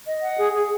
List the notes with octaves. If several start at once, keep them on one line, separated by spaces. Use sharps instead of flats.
D#5
F#5
G#4
G#4